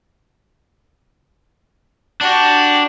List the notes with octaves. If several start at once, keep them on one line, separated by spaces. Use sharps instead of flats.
D4 F#4 G4